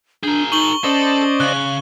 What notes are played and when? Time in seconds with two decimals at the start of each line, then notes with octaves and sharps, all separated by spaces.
0.23 D4 G#4 A#4 G6
0.52 D#4 C#6 F#7 G7
0.84 C#4 A4 C5 D5 D#5
1.40 C#3 F#6